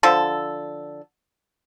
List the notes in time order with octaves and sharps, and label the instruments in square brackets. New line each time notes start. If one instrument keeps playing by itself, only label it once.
[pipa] D3 F3 A4